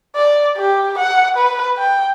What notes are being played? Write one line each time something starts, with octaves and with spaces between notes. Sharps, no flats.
D5
G4
F#5
B4
G5